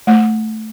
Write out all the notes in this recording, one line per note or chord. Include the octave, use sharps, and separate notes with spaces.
A3